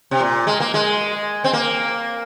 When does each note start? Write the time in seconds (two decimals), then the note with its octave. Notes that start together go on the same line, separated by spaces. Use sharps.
0.11 C3
0.20 A#2
0.47 G#3
0.60 A#3
0.74 G#3
1.44 C4
1.53 A#3